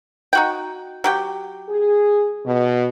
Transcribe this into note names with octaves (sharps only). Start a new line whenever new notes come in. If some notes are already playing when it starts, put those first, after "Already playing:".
D#4 F#4 G5
F#3 G4 G5
G#4
B2